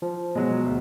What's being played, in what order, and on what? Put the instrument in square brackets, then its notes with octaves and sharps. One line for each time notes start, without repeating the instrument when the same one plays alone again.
[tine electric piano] F3
[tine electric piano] B2 [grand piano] F#3 G#3
[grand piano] D2